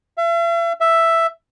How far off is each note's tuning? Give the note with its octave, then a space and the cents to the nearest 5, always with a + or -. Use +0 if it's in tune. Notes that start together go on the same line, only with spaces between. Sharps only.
E5 +40
E5 +5